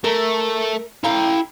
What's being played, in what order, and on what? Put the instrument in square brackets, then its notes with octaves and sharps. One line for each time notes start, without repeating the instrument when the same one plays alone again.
[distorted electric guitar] A3 [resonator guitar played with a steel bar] A#4
[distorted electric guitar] E4 A#5 [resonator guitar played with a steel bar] A4 F5 G5